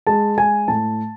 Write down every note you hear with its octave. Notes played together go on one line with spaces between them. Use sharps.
G#3 A5
G#3 G#5
A2 A5